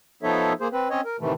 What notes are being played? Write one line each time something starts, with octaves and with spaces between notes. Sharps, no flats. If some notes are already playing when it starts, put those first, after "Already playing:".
F3 B3 D#4 A4 C#5 E5
A#3 G#4 C5
C4 B4
C4 C#4 C#5 D#5
A#4
A2 C3 D#3 E3 A3